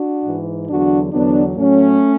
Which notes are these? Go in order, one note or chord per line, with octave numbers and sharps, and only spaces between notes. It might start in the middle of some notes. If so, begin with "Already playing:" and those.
Already playing: D4 F#4
G#2 E3
E2 D3 F#3 D4 F#4
E2 D3 F#3 B3 D4
A2 F#3 A3 C#4